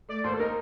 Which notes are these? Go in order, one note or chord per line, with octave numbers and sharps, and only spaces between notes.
A3 D5
D#2 C5
A4
D#4 A#4